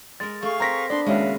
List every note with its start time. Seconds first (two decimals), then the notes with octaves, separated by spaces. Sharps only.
0.20 G#3 A#4 A6
0.43 A3 G#4 F5 C#6
0.60 C4 A#4 A#5 A#6 B6
0.90 B3 D4 D5 C6
1.06 D#2 C#3 G#3 C#4 F#4 E5 F5